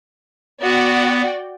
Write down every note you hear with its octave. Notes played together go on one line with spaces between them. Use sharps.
B3 F#4 D5 G5